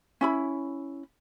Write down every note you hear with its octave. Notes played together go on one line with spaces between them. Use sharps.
C#4 E4 B5